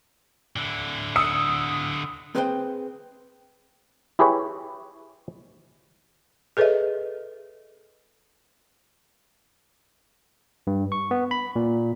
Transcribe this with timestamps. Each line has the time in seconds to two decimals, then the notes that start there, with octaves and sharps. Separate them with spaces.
0.56 D3 E4
1.16 D#6 E6 C#7
2.35 C4 G#4 B4 C5 E5 G5
4.19 E4 G4 G#4 B4 C#5
6.57 G#4 A4 B4 C#5 D#5 E5
10.67 G2
10.92 C#6
11.11 B3
11.31 B5
11.56 A#2